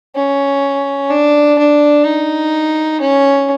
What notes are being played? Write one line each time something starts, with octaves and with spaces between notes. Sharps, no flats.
C#4
D4
D4
D#4
C#4